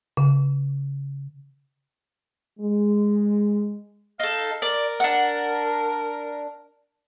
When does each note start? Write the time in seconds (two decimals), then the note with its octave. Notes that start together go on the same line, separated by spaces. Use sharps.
0.17 C#3
2.60 G#3
4.20 D#4 A4 F5
4.62 A#4 D5
5.00 D4 F#5